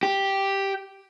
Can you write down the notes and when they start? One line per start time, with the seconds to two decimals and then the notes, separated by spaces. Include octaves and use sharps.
0.03 G4